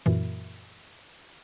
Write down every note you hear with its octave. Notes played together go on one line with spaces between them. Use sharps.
F#2 A#2 E3